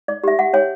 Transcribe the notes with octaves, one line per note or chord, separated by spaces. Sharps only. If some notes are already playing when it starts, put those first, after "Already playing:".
D5
G4 E5
F#5
C#5 G5